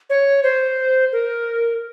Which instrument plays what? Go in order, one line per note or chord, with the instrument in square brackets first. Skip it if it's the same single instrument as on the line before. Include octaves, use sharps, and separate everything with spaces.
[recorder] C#5
C5
A#4